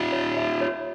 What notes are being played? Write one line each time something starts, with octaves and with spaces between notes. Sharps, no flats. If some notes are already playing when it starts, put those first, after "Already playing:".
Already playing: D#4 F4
C#5
E5
C#5